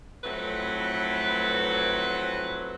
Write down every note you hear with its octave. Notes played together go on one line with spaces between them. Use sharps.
F2 A2 F#3 A3 C4 B4